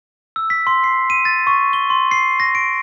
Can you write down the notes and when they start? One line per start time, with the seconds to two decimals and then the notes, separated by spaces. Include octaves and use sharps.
0.36 E6
0.50 B6
0.67 C6
0.84 C7
1.10 D#7
1.25 A6
1.47 C#6
1.73 G7
1.90 C6
2.11 C7
2.40 A#6
2.55 D7